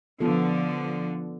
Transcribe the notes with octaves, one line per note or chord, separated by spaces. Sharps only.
D3 F3 B3 F4 A4